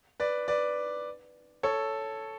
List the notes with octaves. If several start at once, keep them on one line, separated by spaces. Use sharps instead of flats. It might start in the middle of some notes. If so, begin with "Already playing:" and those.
B4 D5
B4 D5
A4 C#5